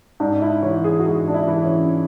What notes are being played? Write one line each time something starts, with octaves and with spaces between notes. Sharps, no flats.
G#2 D4
E4
E3 C#5
G#4
F#4
G#2 G#4
D4
E4
E3
C#4